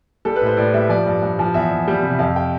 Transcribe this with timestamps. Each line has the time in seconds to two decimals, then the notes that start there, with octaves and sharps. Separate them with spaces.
0.25 G3 A4
0.36 B4
0.41 A2
0.46 C5
0.57 A2 D5
0.74 G3 E5
0.89 F3 D5
1.06 G2
1.22 G2
1.39 F3
1.54 E2 E5
1.71 E2
1.88 G3
2.03 C3
2.19 F2 F5
2.36 G5